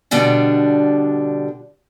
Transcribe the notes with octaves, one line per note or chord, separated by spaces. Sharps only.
B2 D3 G3 D4